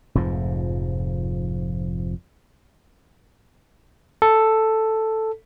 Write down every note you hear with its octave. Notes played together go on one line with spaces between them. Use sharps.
F1 F2 G#2 F3
A4